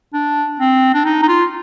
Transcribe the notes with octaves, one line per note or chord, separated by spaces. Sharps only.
D4
C4
D4
D#4
D#4
F4